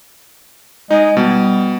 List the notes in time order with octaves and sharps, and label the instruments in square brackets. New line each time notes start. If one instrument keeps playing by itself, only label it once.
[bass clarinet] G#3 [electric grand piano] D#4
[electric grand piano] B2 [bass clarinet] G3